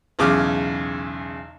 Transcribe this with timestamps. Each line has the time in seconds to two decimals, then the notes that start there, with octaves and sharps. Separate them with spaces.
0.19 B1 E2 C#3 D6 F6